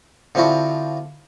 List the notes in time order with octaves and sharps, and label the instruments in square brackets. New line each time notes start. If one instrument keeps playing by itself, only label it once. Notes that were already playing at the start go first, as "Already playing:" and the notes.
[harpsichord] D3 F3 C4 E4 F#4